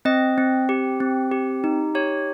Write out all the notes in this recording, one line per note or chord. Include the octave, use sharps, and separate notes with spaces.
C4 D#5
C4
G4
C4
G4
D#4
G4 C#5